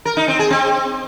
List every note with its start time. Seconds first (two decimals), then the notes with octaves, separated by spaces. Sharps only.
0.05 A#4
0.17 D#4
0.28 C4
0.39 G#4
0.51 C4